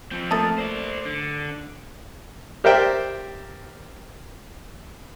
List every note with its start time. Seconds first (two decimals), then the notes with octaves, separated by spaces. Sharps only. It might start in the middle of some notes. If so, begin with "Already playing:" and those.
0.11 F3 C4
0.31 A3 A#3 A5 D#6 A6
0.58 C5 D5
1.05 D3
2.64 G4 A#4 C5 D5 E5 G5